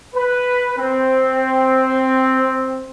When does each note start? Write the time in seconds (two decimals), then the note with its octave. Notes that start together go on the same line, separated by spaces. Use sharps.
0.14 B4
0.78 C4